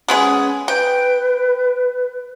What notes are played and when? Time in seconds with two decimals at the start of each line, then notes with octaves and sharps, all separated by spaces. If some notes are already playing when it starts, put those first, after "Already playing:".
0.08 G#3 B3 C#4 G#4
0.68 B4 G5